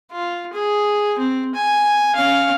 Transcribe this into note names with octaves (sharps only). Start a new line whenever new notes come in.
F4
G#4
C4
G#5
C#4 F5